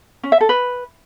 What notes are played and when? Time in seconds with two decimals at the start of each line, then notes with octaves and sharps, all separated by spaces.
0.23 C#4
0.32 E5
0.41 A4
0.49 B4